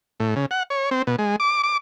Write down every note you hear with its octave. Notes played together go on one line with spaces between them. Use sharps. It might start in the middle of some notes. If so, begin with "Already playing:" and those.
A2
C#3
F#5
C#5
C4
B2
G#3
D6
D6